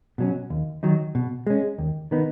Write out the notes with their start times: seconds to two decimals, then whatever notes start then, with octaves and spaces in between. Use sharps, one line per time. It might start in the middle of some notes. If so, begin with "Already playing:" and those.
0.18 B2 F#3 C#4
0.50 D#2
0.83 D#3 F#3 D#4
1.15 B2
1.47 G#3 C#4
1.78 D#2
2.11 D#3 B3 D#4